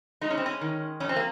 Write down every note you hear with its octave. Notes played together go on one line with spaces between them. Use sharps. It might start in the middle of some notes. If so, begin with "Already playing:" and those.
G#3 D#4
C#4
C4
C#4
D#3
F2 C#4
C4
A#3